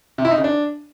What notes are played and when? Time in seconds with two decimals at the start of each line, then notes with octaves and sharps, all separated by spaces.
0.18 C3
0.25 E4
0.31 D#4
0.38 C#3
0.44 D4